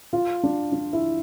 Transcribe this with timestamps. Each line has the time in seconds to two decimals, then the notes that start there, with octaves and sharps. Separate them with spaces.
0.13 F4
0.43 D4
0.72 D4
0.93 E4